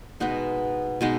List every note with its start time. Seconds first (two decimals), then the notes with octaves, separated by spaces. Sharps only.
0.20 B2 G#3 B3 D#4
1.01 B2 G#3 B3 D#4